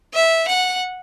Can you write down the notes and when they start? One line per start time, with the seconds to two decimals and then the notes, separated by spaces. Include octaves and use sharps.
0.14 E5
0.48 F#5